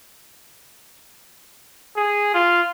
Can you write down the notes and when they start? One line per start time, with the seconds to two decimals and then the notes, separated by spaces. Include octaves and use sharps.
1.96 G#4
2.34 F4